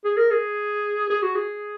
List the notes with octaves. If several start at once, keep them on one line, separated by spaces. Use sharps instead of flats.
G#4
A#4
G#4
G#4
F#4
G#4